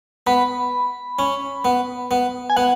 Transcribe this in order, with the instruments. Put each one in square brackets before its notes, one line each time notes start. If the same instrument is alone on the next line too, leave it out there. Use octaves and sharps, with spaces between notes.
[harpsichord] B3 [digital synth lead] B5
[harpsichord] C#4
B3
B3
[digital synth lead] G#5
[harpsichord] B3 [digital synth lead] F#5